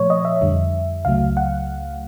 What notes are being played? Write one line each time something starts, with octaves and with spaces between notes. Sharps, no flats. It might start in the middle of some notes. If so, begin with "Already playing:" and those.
Already playing: A#2 F3 A3 C#5
D#5
E5
F2 D3 G3
C#2 C#3 F#3 A3 F5
F#5